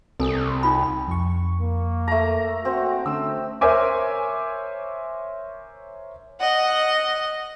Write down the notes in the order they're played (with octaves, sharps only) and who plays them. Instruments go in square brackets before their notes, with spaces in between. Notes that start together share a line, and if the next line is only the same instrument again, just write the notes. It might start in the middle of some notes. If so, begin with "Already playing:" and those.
[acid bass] C2 [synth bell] C4 G#5 D#6 [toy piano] A4 A#4
[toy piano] D#4 F4 B5
[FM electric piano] F2 C#6
[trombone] A#3
[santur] A3 A#5
[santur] C4 [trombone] F#4
[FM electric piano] D3 C#4 [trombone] A3 [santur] E6
[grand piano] A#4 C5 C#5 E5 G#5 D6
[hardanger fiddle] D#5 F#5